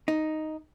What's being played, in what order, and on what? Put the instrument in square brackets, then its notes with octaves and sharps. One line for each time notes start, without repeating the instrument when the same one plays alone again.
[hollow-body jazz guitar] D#4